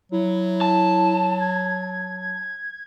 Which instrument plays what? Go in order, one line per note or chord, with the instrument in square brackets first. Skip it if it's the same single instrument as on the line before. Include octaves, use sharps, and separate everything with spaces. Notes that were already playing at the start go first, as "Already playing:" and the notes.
[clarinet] F#3 [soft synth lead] E4
[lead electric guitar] A5
[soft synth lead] G#6